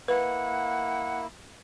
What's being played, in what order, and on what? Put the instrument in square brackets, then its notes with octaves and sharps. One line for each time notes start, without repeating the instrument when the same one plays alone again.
[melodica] A#3 E4 [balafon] B4 [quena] F#5